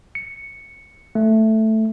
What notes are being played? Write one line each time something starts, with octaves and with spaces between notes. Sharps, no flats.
C#7
A3